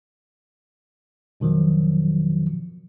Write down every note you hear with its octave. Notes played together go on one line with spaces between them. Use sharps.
F2 B2 D#3 F3 F#3